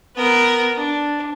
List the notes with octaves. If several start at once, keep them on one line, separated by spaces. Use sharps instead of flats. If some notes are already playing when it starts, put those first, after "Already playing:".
B3 A#4
D4